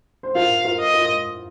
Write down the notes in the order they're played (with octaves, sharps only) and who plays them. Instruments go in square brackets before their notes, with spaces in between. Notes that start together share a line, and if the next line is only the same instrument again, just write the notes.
[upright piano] C5
[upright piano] F4 A#4 [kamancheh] F5
[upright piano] F4 A#4
[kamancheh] D#5
[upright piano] F4 A#4